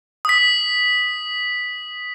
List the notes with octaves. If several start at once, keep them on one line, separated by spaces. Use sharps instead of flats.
D#6 B6